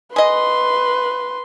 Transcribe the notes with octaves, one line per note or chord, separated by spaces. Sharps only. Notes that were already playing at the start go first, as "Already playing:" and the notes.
G#4 B4 D#5 C6